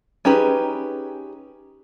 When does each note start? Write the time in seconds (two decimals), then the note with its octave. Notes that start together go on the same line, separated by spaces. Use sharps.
0.25 C#4 D#4 G4 G#4 B4